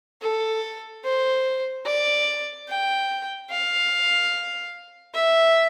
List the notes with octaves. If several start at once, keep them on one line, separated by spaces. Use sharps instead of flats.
A4
C5
D5
G5
F5
E5